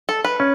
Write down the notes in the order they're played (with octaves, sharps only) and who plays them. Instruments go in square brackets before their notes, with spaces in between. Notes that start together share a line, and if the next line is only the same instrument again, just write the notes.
[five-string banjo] A4
B4
[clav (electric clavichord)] C#4